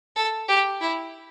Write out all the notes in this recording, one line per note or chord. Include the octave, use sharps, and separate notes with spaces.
A4
G4
E4